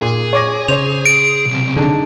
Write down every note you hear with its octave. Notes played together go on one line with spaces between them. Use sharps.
A#2 G#4
C#5 D6 A#6
C#3 C5 C#5 F7
D7
B1 C3
D3 D4 D#4 G#4